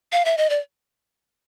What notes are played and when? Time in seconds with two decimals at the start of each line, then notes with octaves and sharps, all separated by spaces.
0.12 F5
0.25 E5
0.37 D#5
0.50 D5